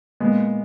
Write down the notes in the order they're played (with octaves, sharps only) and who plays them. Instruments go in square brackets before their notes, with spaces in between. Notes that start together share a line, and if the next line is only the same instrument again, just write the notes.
[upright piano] A#2 G#3 B3